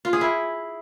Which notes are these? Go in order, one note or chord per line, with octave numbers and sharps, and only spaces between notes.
F4
G#4
E4